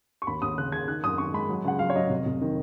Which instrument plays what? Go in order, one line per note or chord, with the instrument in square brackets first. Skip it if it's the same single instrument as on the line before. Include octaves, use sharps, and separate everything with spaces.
[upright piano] C#6
D#2 B5
D#2 D#6
C#3 F#6
C#3 G#6
D#3 F#6
F#2 D#6
D#3 C#6
G#3 B5
F#3
C#2 F#5
F#3 F5
C#5
F#3 D#5
F1
F1
D#3